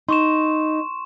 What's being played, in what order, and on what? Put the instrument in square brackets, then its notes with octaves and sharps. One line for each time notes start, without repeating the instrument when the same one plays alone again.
[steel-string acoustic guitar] D#4 [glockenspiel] C6 C#6 E7